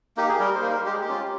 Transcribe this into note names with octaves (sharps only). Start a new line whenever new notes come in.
A#3 D#4 G4
G#4
G3 A#4
C5
A#3 D#4
A#4
G#3 G4
G#4
G4
C#4 F4